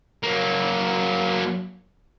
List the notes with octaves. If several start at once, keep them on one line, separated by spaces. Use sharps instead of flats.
F#3 A#3